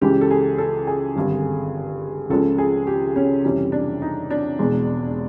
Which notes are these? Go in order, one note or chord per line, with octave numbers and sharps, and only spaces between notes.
C#2 C#3 E3 G#3 G4
A4
G#4
A4
G#4
G#1 G2 D3
C#2 C#3 F3 G#3 A4
G#4
G4
C#4
F2 C3 E3 G3 C#4
D4
D#4
D4
E1 E2 B2 G#3